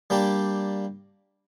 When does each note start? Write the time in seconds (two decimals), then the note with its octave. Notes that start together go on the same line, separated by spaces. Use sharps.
0.10 G3 A#3 D4 G4